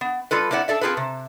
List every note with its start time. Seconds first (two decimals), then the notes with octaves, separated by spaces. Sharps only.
0.01 B3
0.31 G3 F4 A4 B4
0.51 A#3 C4 E4 D5 F#5
0.68 D4 A4 D5 E5
0.81 C4 F4 G#4 A4 B4
0.97 C3